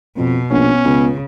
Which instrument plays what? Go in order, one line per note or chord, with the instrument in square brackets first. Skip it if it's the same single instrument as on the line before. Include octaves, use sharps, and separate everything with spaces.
[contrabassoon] F2 [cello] B2
[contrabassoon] A#1 [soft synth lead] B3 [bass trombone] C#4
[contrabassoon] C#2 [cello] C#3